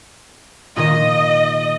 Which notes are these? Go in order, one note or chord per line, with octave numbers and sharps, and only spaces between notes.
A#2 D#3 D#5